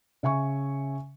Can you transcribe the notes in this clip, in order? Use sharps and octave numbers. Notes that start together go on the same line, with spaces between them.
C#3 E5 G#5 C#6